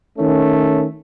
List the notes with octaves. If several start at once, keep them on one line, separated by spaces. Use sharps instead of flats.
D#3 A3 C#4